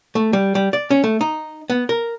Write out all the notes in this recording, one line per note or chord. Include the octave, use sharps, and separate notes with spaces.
A3
G3
G3
D5
C#4
A3
D#4
B3
A#4